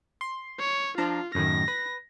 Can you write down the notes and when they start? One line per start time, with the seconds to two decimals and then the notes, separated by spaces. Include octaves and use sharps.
0.21 C6
0.60 C#5
0.98 F3 D4 F4 A#5
1.35 F#2 A2 D#3 A#6
1.68 B4